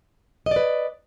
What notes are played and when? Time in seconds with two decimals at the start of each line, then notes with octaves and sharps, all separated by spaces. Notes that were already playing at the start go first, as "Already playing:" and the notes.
0.46 D#5
0.51 D5
0.56 B4